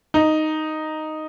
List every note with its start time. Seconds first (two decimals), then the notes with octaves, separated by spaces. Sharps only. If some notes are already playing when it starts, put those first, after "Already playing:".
0.14 D#4